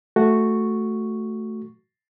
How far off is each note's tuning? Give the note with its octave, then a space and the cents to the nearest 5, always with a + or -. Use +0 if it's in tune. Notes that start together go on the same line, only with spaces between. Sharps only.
A3 +0 F#4 -5 C#6 +0